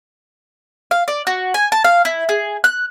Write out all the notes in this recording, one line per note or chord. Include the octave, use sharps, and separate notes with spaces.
F5
D5
F#4
G#5
A5
F5
E4
G#4
F#6